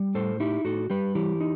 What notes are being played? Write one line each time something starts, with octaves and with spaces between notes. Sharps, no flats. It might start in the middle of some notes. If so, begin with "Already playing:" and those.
Already playing: G3
A2 A4 C5
D#4 E4 G4
A2 F#4 A4
G3 G4 B4
E3 E4 G4
D#4